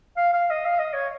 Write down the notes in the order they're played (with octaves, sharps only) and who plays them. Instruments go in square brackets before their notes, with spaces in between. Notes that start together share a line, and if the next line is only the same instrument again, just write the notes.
[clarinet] F5
F5
D#5
F5
D#5
C#5